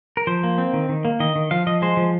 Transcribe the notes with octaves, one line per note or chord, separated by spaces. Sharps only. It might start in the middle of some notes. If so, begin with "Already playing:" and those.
A#4
F3 C5
A#3
C4
D#3
D#3
A#3
D#3 D#5
D#3
F3 F5
F3 D#5
G#3 C5
F3